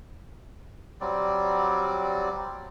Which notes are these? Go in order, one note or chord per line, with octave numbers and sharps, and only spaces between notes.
F#3 G3 C4 D5